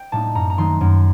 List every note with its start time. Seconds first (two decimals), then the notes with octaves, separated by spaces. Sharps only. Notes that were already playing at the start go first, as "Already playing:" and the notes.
Already playing: G5
0.12 A2 G3 A#3 D#4 A5
0.35 F#2 A#5
0.50 A#5
0.58 D#3 F#3 A3 D#4 C6
0.81 F#2